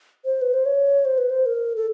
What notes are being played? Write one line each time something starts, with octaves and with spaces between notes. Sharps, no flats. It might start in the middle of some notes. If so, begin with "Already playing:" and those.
C5
B4
C5
C#5
C5
B4
C5
A#4
A4